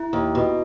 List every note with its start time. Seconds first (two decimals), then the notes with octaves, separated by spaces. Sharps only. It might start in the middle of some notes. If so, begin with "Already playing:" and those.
Already playing: E4
0.13 D#2
0.35 B2